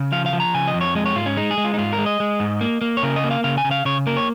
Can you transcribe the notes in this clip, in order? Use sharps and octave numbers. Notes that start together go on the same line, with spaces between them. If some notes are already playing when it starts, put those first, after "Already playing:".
Already playing: C#3
F3 F5
F5
F3
A#5
C#3 G#5
D#5
F2
C#5
G#3 D#5
C#5
G#2 F4
C#4
G#3 D#4
G#4
G#3
F4
D#4
G#2 F4
A#4
G#3
D#5
G#3
G#2
A#3
A#3
C#5
C#3 A#4
D#5
A#3
F5
C#3 F5
G#5
C#3
F5
C#3 C#5
A#3 A#4
C#5